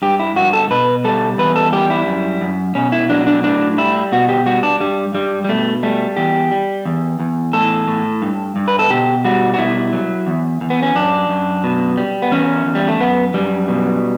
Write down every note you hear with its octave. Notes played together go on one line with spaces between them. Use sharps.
G2 G4
E4
G2 F#4
A4
B2 B4
G3 A4
E2 B4
A4
G3 G4
E4
F#2
F#2
B2 C#4
E4
F#3 D4
D4
A2 D4
G3 E4
B2 F#4
G4
G3 F#4
D4
G2 G3
G2 G3
G3
B2 A3
G3 A3
E2 G4
G3
E2
E2
A2 A4
A2
G2
G2
B4
A4
B2 G4
G3 F#4
F#4
B2 E4
F#3
E2
E2
B3
C#4
F#2 D4
F#2
B2
G3
B3
E2 C#4
E2
G3
A3
F#2 B3
F#2 G3
B2